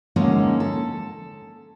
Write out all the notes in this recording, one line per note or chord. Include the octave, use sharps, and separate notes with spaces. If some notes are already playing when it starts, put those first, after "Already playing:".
D3 G#3 A#3 C#4 D#4
A4